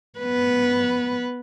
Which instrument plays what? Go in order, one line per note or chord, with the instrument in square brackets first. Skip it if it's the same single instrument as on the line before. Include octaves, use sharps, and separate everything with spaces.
[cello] B3 B4